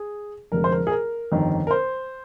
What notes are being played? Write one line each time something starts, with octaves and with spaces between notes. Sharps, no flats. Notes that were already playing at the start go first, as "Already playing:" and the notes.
Already playing: G#4
F1 F2 D3 G#3 A#4
C5
A#4
G#4
A#4
G1 F2 D#3
A#4
C5